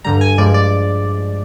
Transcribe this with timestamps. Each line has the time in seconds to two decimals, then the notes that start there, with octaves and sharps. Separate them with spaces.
0.04 G2 D3 G3 A#5
0.21 G#5
0.38 G2 F3 G#3 D5
0.54 D5